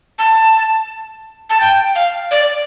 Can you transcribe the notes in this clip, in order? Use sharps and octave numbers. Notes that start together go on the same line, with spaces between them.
A5
A5
G5
F5
D5